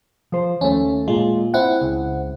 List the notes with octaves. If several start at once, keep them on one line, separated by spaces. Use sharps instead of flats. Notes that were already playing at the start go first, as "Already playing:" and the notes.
F3 C5
D#2 A3 C#4
A#2 G#3 F4
C4 E4 F#5
C#2